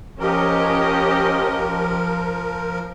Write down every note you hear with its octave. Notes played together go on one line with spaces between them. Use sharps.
F3 C#4 G4 A#4 D#5